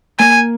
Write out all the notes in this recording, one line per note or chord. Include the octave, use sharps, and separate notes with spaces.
A#3 G#5